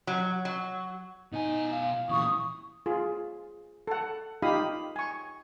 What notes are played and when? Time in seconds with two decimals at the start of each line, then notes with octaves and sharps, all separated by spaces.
0.07 F#3
0.45 F#3
1.33 B2 D#4 G#5
1.72 F5
2.09 A#2 E3 C#6 D#6
2.86 F4 G#4
3.87 A4 F#5
4.42 D#4 F4 G4 F5 B5 D#6
4.96 G#5 C#6